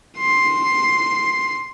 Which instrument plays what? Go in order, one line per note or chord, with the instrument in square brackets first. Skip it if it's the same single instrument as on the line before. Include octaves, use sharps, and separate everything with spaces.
[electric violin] C6